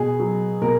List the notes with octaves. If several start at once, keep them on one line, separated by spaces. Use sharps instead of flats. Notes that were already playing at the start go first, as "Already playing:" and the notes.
Already playing: B2 G#4
F#3
B2 A#4